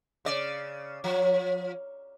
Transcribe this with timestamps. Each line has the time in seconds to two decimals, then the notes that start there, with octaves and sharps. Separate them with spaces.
0.25 C#3 D5
1.04 F3